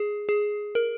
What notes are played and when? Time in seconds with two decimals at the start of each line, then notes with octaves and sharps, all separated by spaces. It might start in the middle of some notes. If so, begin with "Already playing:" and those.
Already playing: G#4
0.29 G#4
0.75 A#4